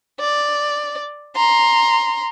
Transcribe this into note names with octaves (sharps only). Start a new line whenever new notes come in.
D5
A#5 C6